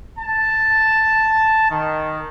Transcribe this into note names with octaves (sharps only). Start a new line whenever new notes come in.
A5
D#3